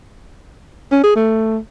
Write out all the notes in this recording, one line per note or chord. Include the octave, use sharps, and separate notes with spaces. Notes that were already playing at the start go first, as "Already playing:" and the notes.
C#4
G#4
A3